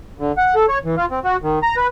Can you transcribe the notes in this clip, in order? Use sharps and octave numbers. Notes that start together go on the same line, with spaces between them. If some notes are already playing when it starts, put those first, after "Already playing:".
D3
F#5
A4
C#5
E3
F4
C4
F#4
D#3
A#5
B4